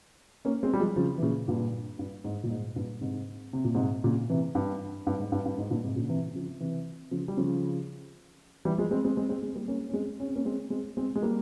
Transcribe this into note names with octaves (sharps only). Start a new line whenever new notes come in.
A#3 C#4
G#3 C4
G3
F3 G#3
C#3 F3
E3
A#2 C#3
G2 A#2
G2
G#2
A#2
G#2
G2 A#2
G#2 C3
C3
A#2
G#2 C3
A#2 C#3
C3 E3
G2
G2
G#2
G2
G2
G#2
G2 A#2
G#2 C3
A#2 C#3
C3 E3
C#3 F3
C3 E3
C#3 F3
G3
C#3 F3
E3 G3
F3 G#3
G#3 C4
G#3 C4
G#3 C4
G#3 C4
G#3 C4
G3 A#3
A#3 C#4
C#4
G#3 C4
C#4
C4
A#3 C#4
G#3 C4
G#3 C4
G#3 C4
G#3
G3 A#3